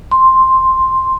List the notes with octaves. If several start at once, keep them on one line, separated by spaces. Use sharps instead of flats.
C6